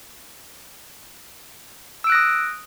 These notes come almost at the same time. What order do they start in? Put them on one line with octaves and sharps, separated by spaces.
E6 D7 F#6 A#6 D#6